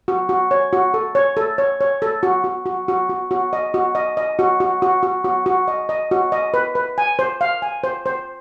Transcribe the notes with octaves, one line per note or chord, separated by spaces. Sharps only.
F#4
F#4
C#5
F#4
A4
C#5
A4
C#5
C#5
A4
F#4
F#4
F#4
F#4
F#4
F#4
D#5
F#4
D#5
D#5
F#4
F#4
F#4
F#4
F#4
F#4
D#5
D#5
F#4
D#5
B4
B4
G#5
C5
F5
G#5
C5
C5